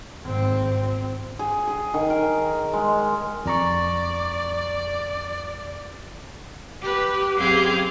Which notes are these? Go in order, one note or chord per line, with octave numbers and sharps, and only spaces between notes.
G#1 C4
G#4
G#4
D#3
A#4
G#3
F2 D5 A#5 C#6
G4 B4
F#2 C4 G4 G#4 F5 G6